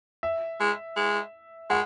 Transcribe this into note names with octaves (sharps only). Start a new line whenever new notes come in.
E5
G#3
G#3
G#3 F#5